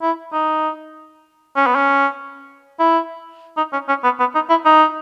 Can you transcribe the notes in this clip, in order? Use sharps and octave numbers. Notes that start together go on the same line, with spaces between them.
E4
D#4
C#4
B3
C#4
E4
D#4
C#4
C#4
B3
B3
D#4
E4
D#4